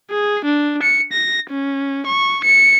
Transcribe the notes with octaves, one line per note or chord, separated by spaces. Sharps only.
G#4
D4
C#7
A#6
C#4
C#6
C#7